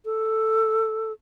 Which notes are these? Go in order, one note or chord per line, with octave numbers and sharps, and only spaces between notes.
A4